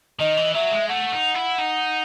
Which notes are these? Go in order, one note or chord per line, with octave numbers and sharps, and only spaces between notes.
D#3 D#5
E3
F#3 E5
G#3
A3 F#5
D#4
E4
D#4